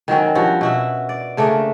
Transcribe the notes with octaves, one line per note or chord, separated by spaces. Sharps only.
D#3 F#3 C4 C#4
G2 F3 F#4
B2 F#4 E5
D5
C#3 A3 A#3 D4